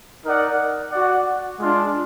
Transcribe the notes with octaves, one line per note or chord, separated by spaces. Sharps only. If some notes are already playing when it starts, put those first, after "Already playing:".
D#4 A#4 D5 F#5
F#4 D5 F#5
G#3 D4 F4